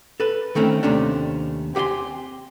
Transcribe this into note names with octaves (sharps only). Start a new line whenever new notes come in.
A4 B4
D#3 A3 C4 C#4
D#2 C3 A3 C#4 D4
C4 G4 F#5 G#5 C6